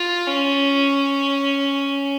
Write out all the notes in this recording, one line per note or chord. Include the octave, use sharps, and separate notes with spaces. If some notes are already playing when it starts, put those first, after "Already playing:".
Already playing: F4
C#4